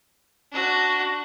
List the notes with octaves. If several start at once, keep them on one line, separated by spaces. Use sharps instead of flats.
D4 F#4